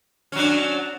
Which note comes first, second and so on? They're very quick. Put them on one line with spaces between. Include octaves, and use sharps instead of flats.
C#4 F#3 D4